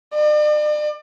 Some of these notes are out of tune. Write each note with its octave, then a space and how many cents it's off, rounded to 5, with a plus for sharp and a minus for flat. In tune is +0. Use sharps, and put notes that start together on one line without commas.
D5 +40